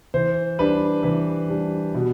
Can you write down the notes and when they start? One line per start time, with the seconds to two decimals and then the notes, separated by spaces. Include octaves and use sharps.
0.14 E3 C5
0.58 G3 D4 B4
1.03 E3 B4
1.48 G3 D4
1.94 B2